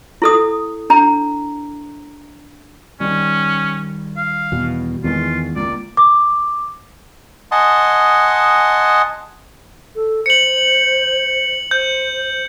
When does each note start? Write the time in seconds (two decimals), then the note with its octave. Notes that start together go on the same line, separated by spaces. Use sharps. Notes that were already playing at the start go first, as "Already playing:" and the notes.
0.22 E4 A4 D#6
0.90 D4 A#5
3.00 D#3 G3 C#4
4.17 F5
4.52 E2 B2
5.04 E2 D#3 E3 G#3 F4
5.56 C#2 A#3 D5
5.97 D6
7.52 D#5 F#5 G#5 A5 C6 D#6
9.95 A4
10.26 C5 C#7 F#7
11.71 C5 G6